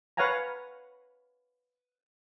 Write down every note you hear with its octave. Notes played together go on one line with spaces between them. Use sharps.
B4 C#5 F5 F#5 G#5 A#5